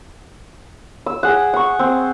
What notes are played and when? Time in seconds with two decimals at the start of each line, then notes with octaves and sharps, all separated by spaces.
1.06 E6
1.23 G#4 F#5
1.53 F#5 C#6
1.79 C4